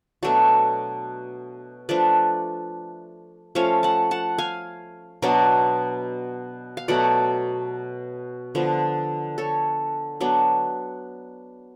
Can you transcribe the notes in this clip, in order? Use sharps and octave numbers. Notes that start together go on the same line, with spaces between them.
B2 F#3 A3 D4 F#4
F3 A3 D4 B4 D5
F3 A3 C#4 C#5 F5
F#5 A5
F#5 A5
F5 G#5
B2 F#3 B3 D4
F5
B2 F#3 A3 D5 F#5
D3 F3 B3
A4 C#5
F#3 B3 D4